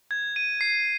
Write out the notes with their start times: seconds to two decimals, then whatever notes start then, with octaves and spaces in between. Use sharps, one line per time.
0.11 G#6
0.36 D#7
0.61 C7